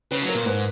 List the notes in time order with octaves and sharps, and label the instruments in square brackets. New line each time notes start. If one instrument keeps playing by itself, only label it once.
[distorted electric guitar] C#3 [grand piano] B4
[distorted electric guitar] F#3
[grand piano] A#4
[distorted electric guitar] A#2
[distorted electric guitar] G#2 [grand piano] B4